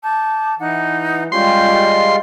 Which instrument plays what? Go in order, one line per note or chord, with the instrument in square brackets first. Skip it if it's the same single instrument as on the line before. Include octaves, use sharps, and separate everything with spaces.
[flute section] A5 D6 G6
[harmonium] E3 [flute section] D#4 F#5 F#6
[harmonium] G3 G#3 F4 [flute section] C#4 G4 G6 [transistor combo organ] C6